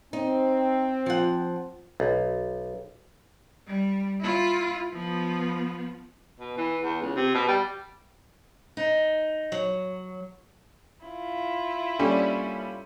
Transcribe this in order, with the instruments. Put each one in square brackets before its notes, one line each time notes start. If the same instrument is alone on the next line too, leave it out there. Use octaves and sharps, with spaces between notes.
[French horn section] C4 [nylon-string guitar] D#4
[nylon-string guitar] F3 F#5
[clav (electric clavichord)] B1
[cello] G3
E4 F4
F3 B3
[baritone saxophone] B2
E3
E2
C#2
C3
B2
G3
[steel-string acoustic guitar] D#4
F#3
[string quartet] E4 F4
[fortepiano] G3 C#4 A4 [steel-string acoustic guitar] A#3 D4 D5